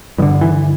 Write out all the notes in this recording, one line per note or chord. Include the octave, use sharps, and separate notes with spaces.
G2 D3 D#3
E3